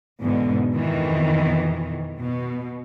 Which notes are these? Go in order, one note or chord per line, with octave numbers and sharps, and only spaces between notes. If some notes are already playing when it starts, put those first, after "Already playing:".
E2 G#2 B2 D3
F2 B2 D#3 E3
B2